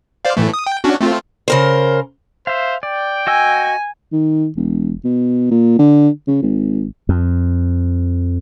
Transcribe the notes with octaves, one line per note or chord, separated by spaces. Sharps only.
C5 D5 F5
A2 E3 A3
D#6
G5
C#4 D4 F#4
A3 C4 F4
C#3 A#4 C5
C5 E5 F5
D5 G5
F#4 D#5 G#5 E6
D#3
E1
B2
A#2
D3
C#3
G#1
F2